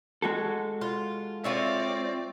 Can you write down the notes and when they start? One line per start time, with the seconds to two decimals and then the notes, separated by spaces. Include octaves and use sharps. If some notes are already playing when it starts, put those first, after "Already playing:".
0.22 G#3 F#4 A4
0.81 F4
1.44 C4 F4 C#5 D5 E5